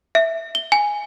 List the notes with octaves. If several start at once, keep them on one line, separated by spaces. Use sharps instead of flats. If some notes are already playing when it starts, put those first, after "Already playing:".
E5
G7
G#5